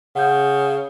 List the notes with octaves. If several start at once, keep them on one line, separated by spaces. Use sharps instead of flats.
C#3 F#5 G6